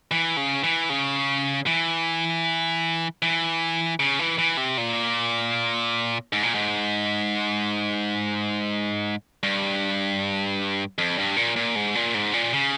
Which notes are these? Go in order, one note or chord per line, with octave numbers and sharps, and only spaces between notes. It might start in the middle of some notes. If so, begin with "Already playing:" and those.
E3
C#3
E3
C#3
E3
E3
C#3
E3
E3
C3
A#2
G#2
A#2
G#2
G2
F2
G2
A#2
A#2
G#2
A#2
G#2
A#2
C#3